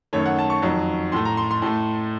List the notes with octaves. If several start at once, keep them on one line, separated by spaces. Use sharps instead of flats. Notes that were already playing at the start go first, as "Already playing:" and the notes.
F#2 D#3 A3 C#5
F#5
A5
C#6
F2 D#3 F#3
A2 A3 C6
A#5
C6
C6
A2 A3